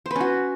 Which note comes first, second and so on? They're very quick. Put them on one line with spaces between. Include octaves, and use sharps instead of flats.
C5 B4 C#4 F#4